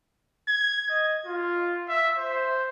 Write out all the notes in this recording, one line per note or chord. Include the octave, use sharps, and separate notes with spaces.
G#6
D#5
F4
E5
C5